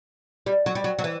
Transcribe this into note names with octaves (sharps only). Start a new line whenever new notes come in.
G3
F#3
G3
F#3
F#3
E3